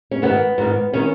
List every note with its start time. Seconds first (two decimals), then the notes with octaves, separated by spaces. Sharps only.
0.11 C#4
0.22 G#2 D#3 B3
0.58 G#2 D#3
0.93 D#3 C#4